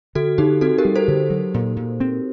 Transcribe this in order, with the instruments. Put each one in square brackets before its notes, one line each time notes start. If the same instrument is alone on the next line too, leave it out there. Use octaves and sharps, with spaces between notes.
[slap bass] D3 [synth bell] F#4 A4
[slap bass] D3 [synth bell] D#4 G4
[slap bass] C4 [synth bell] F#4 A4
[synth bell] G4 A#4
[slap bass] G3
[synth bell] A4 C5
[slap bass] D3
F#3
A#2
A#2
C4